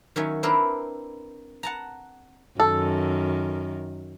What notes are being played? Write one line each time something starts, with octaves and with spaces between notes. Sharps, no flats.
D#3 F#3 C#4 E5
C4 D4 E4 A#4 B4
F#5 A5 A#5
F#2 D#3 A4